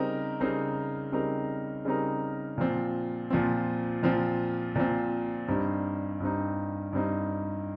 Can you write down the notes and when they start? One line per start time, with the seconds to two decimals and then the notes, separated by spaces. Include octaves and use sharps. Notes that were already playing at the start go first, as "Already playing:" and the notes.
Already playing: C#3 G3 C4 D#4 A#4
0.40 C#3 G3 C4 D#4 A#4
1.12 C#3 G3 C4 D#4 A#4
1.85 C#3 G3 C4 D#4 A#4
2.58 A#2 F3 C4
3.30 A#2 F3 C4
4.03 A#2 F3 C4
4.75 A#2 F3 C4
5.48 G2 G3 C4 D#4
6.20 G2 G3 C4 D#4
6.93 G2 G3 C4 D#4